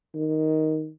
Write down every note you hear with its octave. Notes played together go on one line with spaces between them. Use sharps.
D#3